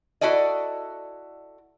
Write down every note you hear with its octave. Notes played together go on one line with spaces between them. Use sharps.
E4 F#4 A4 D5 D#5